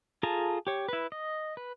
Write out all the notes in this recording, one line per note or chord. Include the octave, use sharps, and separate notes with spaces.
F4 G#4 A4 A5 A#5
G4 C#5
E4 B4
D#5
B4